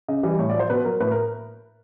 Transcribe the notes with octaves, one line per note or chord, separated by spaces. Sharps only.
C#3 D#5
E3 G3 D#5
A2 C#5
D5
F3
C5
B2 B4
F#3 A#4
A2 B4
A#4